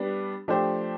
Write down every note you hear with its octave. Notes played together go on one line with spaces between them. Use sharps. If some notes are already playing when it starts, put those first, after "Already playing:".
Already playing: G3 B3 D4
F3 A3 D4 G4 C5